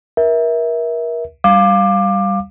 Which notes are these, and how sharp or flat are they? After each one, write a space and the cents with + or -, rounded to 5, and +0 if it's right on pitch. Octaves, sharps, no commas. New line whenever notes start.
A#4 +30 E5 -15
G3 +0 F5 +5 D6 +20